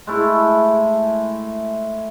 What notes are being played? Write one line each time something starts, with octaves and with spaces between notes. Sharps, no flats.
G#3 A3 E4